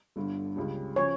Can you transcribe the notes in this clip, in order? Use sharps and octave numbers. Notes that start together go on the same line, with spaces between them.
G1 G2 D3
C#2 C#3 G3
C#3 F3 C#4 C#5